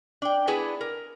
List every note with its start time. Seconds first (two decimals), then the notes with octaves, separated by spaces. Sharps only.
0.22 D4 G5
0.47 B3 D4 E4 G#4 B4
0.81 A#4